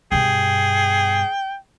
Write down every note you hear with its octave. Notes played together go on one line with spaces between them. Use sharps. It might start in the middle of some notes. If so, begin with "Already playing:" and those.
G2 B2 G#4 G5